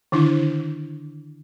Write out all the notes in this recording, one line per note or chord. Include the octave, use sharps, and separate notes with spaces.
D3 D#3 D4 E4